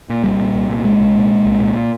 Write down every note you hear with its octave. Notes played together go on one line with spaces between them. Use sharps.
A#2
C2 G3
A#2
C2
A#2
C2 G#3
C2
A#2
A#2
C2
A#2